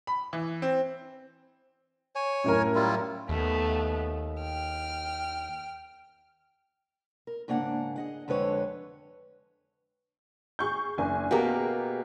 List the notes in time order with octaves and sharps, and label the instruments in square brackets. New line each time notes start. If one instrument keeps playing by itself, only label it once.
[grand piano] B5
E3
C4
[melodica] C#5 G#5
[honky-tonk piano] F#2 A2 A#4
[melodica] G3 E4 F4
[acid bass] D#2 [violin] A3 B3
[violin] G5 F6
[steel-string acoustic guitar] A#4
G#2 C#3 A#3 D4 F#5
G#4 D#5 F#5
F2 D3 G#3 B4 C#5
[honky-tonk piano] G#4 C#6 G6
F#1 D4 G#5
[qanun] B2 A#3 [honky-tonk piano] G4 G#4 A#4